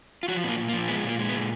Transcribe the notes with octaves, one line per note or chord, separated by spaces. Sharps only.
F4
F3 F#4
A#2 A#3 B3
A#2
A#3
F3
G#3 B3
A#2
A#3
G#3
B3
A#2